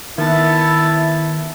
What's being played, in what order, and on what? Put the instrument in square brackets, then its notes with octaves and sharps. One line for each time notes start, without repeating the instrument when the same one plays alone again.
[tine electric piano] D#3 [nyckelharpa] B3 A5 [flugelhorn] E4 [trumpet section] E5